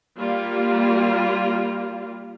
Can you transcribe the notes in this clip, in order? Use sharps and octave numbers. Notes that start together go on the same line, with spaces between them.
G3 A#3 F4